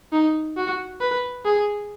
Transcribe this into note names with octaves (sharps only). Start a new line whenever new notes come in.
D#4
F#4
B4
G#4